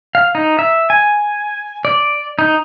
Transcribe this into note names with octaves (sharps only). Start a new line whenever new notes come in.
F5
D#4
E5
G#5
D5
D#4